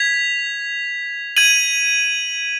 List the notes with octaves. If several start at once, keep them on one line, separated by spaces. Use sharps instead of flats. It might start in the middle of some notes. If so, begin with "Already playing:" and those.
Already playing: G#6 B6 F7
G#6 D#7 F#7